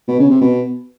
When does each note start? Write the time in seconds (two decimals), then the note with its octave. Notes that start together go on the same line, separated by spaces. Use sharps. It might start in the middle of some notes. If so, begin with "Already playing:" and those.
0.08 B2
0.19 C#3
0.30 C3
0.41 B2